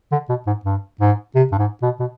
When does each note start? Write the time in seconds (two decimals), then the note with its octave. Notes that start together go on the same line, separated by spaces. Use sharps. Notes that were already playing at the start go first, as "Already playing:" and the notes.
0.11 D3
0.29 B2
0.46 G#2
0.65 G2
1.01 G#2
1.35 C3
1.52 G2
1.58 G#2
1.82 B2
2.00 B2